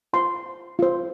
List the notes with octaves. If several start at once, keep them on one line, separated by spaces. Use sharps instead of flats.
F4 C5 C6
F4 C5